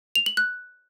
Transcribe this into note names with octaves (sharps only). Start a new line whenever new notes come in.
F7
F#7
F#6